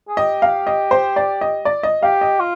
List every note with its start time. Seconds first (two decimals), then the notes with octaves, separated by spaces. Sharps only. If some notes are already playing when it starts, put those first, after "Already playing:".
0.08 G#4
0.17 G4 D#5
0.42 F5
0.67 D#5
0.91 C5
1.16 D5
1.41 D#5
1.65 D5
1.83 D#5
2.03 G4 F5
2.21 D#5
2.40 F4